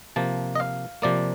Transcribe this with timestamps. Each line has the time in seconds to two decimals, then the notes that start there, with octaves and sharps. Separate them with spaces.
0.16 C3 F3 A#3 A5
0.55 D#5
0.60 F5
1.02 C3 F3 A#3 D5